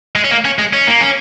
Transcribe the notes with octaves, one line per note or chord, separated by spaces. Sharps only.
G#3
C#4
A#3
C#4
G#3
C#4
A#3
C#4